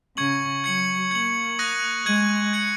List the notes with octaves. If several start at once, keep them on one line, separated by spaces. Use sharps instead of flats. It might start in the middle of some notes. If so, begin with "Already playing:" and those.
C#3 C#6 G#6 C#7 F#7
F#3 G#6 C#7 F#7
A#3 G#6 F#7
D#6 F#6 A#6 D#7 F#7
G#3 D#6 G#6 D#7 F#7
G#6 C#7 F#7